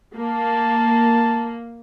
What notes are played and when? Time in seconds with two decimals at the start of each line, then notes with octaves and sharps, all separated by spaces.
0.17 A#3 A5